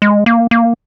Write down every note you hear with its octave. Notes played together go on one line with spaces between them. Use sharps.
G#3
A#3
A#3